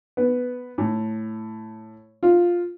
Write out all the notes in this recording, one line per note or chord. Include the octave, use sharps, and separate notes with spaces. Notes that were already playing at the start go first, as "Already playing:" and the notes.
B3
A2
F4